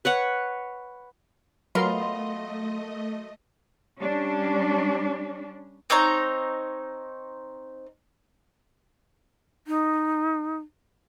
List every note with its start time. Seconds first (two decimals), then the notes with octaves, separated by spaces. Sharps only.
0.05 B4 C#5 F#5
1.75 F#3 A3 B3 F4 A#4 D#5 C6
4.00 G3 C#4 D4
5.90 C4 D#4 C#5 A#5
9.67 D#4